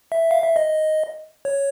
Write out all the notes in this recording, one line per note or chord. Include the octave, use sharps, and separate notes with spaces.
E5
F5
E5
D#5
C#5